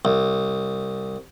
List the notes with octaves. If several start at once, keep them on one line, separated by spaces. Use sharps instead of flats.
C2